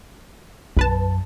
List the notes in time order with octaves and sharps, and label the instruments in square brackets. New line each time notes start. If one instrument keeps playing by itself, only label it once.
[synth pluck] B1 B4 A5 [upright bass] F#2